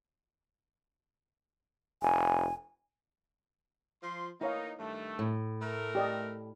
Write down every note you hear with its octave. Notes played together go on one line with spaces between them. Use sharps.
F1 G#5
F3 C6
A#3 D#4 E4 C#5 F5
G2 D#3 A3
A2
A3 A#4
G4 D5 D#5